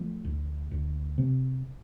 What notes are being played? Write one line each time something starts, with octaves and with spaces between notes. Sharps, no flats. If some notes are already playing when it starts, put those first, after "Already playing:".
Already playing: F3 A3
D2
D2
C3